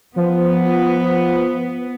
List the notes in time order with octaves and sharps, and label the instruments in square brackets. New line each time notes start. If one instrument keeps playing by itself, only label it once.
[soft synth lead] F3 [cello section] B3